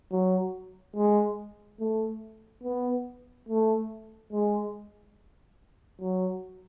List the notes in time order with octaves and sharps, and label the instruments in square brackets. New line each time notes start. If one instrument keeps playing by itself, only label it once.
[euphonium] F#3
G#3
A3
B3
A3
G#3
F#3